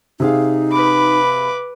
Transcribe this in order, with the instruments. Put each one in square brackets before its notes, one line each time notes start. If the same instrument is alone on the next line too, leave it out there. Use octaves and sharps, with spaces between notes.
[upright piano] C3 G#4 F5 [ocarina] D#4
[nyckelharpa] B4 D6 [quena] B5